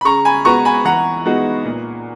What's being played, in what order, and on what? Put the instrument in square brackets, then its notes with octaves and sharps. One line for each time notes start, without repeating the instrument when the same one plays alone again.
[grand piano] B5
[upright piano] C#3 [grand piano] A#5 C#6
[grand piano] G#5 B5
[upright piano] G#3 B3 F#4 B4 [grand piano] A#5 C#6
[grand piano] G#5 B5
[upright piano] E3 [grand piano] F#5 A#5
[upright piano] G#3 B3 D#4 F#4
A#2